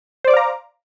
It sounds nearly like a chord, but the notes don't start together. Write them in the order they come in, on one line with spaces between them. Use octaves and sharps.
C5 D5 D6 F5 A#5